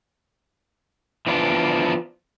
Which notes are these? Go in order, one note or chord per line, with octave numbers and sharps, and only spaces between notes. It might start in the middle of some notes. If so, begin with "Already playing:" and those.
E3 F3 B3 D4 F4